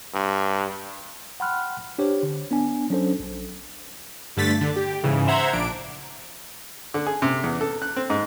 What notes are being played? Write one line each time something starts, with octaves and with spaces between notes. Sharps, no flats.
G2
F#5 G5 B5 C6 F6 F#6
D4 G4 C5 C#5
D3
B3 D4 G#5
F#3 C#4 D4 A4 C5
A#1
G2 D3 A3 A6 B6
D3
G4
G#2 C#3 E3
C5 E5 F#5 A#5 G#6
A#1 D4 D7
D3
G#4
C3
E2
A4
F#6
C4
G#2